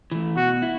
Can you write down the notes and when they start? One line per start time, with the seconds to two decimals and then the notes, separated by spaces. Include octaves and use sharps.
0.11 E3 A3
0.36 B2 F#4
0.62 E4